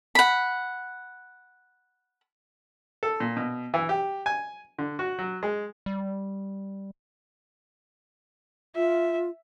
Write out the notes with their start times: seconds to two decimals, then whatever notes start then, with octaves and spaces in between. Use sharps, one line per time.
0.15 F#5 B5
3.03 A4
3.20 A#2
3.37 B2
3.74 E3
3.89 G4
4.26 G#5
4.78 D3
4.99 F#4
5.19 F#3
5.43 G#3
5.86 G3
8.76 F4 E5